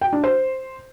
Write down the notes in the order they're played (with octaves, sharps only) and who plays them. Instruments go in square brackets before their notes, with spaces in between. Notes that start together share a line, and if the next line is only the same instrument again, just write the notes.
[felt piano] G5
D4
C5